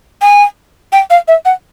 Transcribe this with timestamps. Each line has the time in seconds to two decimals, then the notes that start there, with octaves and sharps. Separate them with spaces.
0.22 G#5
0.93 G5
1.10 F5
1.28 E5
1.45 F#5